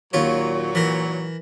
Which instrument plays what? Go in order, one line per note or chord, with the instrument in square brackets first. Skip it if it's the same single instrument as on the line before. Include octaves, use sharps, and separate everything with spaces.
[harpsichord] D#2 F4 C#5 [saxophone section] A#2 F#3
[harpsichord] E3 A#4